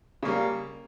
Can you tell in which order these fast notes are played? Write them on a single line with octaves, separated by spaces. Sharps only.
C#3 A#3 G3